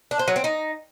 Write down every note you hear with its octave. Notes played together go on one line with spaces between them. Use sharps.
D4
C5
F#3
C4
D#4